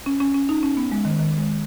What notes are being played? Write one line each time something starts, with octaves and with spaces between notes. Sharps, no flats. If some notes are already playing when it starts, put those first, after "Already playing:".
C#4
C#4
C#4
D#4
C#4
B3
G#3
D#3
D#3
G#3